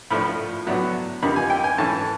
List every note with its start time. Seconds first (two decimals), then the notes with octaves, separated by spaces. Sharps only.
0.10 A2 F3 A3 D4 B5
0.67 A2 F#3 B3 D4
1.22 F2 D3 G3 A#3 D#4 B5
1.36 G#5
1.50 G5
1.64 G#5
1.78 G#2 E3 A3 C#4 A5